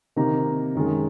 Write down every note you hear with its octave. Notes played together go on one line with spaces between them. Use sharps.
C3 D#3 A#3 D#4 A#5
F#2 D#3 G#3